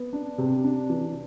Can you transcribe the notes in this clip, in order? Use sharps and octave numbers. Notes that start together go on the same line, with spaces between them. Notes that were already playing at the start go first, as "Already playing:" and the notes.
Already playing: B3
D4
C3
D4
E3